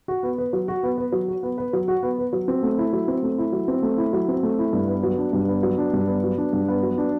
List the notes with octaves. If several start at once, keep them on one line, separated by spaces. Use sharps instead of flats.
F#4
B3
B4
F#3
F#4
B3
B4
F#3
F#4
B3
B4
F#3
F#4
B3
B4
F#3
C4
A3
E4
F#3
C4
A3
E4
F#3
C4
A3
E4
F#3
C4
A3
E4
G2
B3
F#3
D4
G2
B3
F#3
D4
G2
B3
F#3
D4
G2
B3
F#3
D4